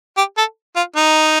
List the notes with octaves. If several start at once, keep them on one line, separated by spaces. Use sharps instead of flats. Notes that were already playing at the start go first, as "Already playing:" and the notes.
G4
A4
F4
D#4